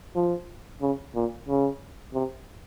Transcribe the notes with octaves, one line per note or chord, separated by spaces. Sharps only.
F3
C#3
A#2
C#3
C3